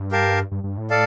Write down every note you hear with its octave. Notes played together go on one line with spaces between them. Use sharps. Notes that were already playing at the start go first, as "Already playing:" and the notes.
Already playing: G2
G4 A#4 F5 A5
G2
G2
A2
A4 D5 F5 A5